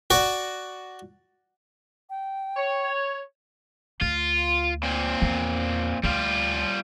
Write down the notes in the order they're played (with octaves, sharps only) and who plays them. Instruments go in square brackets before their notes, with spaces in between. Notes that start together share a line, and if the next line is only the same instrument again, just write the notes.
[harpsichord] F#4 D5
[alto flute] G5
[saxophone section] C#5
[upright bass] D2 [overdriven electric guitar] F4
[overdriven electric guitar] A#2 C4
[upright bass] E2
[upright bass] D2 [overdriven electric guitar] G3 F4